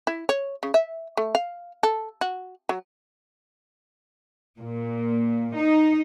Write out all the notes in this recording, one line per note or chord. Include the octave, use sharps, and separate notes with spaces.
E4
C#5
C#3
E5
A3
F5
A4
F#4
F#3
A#2
D#4